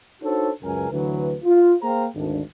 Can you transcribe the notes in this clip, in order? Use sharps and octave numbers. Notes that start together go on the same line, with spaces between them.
D4 D#4 F#4 A4 C5 C#5
C#2 F#2 C#3 A#4 B4 G#5
D2 D3 E3 F#3 B4
F4
A#3 G#4 C5 F5 G5 A#5
G#1 D2 D4